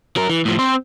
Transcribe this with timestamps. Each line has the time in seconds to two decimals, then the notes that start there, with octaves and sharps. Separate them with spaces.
0.16 F#3 A#4
0.30 E3
0.45 A2 F3
0.59 C4 C5